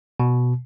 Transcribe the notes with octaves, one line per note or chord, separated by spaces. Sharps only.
B2